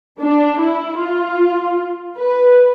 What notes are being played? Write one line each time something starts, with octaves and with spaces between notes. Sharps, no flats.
D4
E4
F4
B4